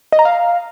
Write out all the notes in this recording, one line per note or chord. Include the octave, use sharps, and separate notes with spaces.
D#5
A#5
F5